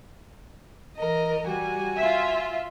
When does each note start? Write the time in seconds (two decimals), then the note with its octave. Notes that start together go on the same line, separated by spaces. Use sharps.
0.96 E3 A#4 D#5
1.45 G3 F#4 G#5
1.96 F4 E5